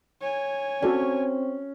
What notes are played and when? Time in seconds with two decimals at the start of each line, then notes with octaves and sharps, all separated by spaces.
0.21 C#5 G#5
0.82 C4 C#4 F#4 A4 D5